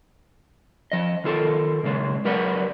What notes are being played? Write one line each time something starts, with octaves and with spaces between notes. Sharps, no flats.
F3 D#5
D#3 F4 A4 A#4
A#2 C#3 G#3 D4
F#3 G4 A#4 B4 D5 F#5